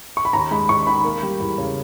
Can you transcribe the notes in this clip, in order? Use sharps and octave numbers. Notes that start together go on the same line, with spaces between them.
C#6
B5
D#2 A#5
G#3 B5
D#2 C#6
D#3 B5
A#3
G3
E2
C#3